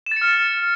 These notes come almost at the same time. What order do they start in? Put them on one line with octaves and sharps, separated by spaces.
E7 A6 C#7 F6